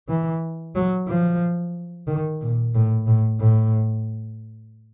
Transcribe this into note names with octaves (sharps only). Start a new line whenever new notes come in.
E3
F#3
F3
D#3
A#2
A2
A2
A2